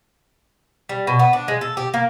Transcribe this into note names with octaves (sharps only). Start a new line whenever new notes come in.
G3
B2
B3
D4
G#3
A4
G4
A#3